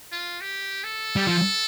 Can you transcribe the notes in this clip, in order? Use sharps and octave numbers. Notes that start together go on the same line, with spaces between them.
F4
G4
A4
G3
F3